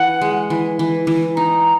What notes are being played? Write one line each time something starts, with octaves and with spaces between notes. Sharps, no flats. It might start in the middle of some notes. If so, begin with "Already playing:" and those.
Already playing: E3 F#5
G#3
E3
E3
E3
D#4 A#5